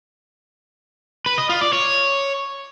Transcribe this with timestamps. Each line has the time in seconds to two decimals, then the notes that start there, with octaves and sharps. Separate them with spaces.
1.26 B4
1.38 D#5
1.50 F4
1.61 D5
1.73 C#5